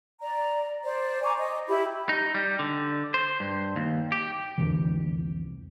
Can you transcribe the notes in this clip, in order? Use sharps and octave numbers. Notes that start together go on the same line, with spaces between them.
D5 A#5
C5 D5
G#5 A#5 C#6 D6
D#5
E4 G4 B5
D#4
G3
D3
C5
G2
D#2
G4
C2 F2 D3 E3